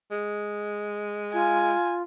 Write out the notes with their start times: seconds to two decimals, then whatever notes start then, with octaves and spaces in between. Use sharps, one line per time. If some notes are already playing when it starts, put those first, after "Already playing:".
0.11 G#3
1.33 F4 G#5